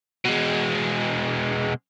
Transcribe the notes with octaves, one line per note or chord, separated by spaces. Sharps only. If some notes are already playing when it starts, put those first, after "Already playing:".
B2 G#3